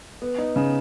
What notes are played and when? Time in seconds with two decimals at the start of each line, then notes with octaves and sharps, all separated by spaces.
0.22 B3
0.38 D#4
0.56 C#3